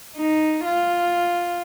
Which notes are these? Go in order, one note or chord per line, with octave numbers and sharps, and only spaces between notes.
D#4
F4